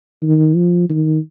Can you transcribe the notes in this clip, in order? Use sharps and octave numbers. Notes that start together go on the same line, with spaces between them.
D#3
F3
D#3